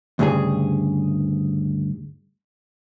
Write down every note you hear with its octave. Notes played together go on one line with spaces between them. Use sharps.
D2 G2 C#3 G#4